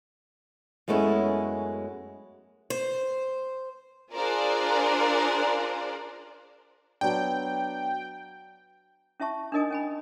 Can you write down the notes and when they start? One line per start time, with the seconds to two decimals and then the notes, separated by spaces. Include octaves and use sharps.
0.88 F#2 G#3 A3 B3 C#4 E4
2.70 C5
4.14 D4 F4 G#4 A#4 C5 D5
7.01 F#3 B3 D4 G5
9.20 C#4 E4 E5 A5 C#6
9.52 D4 D#4 A#4 D#5 G#5 D#6
9.71 C#4 G#5 B5